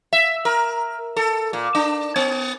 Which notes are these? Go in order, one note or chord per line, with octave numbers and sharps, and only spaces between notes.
E5
A#4
A4
A#2
D4
B3